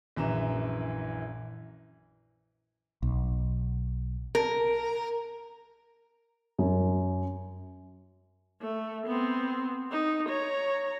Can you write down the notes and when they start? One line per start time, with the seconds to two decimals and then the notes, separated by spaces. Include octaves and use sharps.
0.16 A#1 F#2 E3 E4 A#5 E7
3.03 B1
4.35 A#4
6.58 F#2
8.61 A3
9.06 B3 C4
9.92 D#4
10.29 C#5 A#5